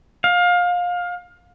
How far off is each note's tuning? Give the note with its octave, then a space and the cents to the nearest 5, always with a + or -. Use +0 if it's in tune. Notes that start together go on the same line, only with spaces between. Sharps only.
F5 +25